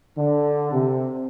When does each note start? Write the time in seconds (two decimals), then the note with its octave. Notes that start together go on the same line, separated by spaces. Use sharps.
0.18 D3
0.73 C3